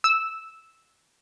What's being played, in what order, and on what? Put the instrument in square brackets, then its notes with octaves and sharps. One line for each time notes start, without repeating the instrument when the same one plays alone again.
[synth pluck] E6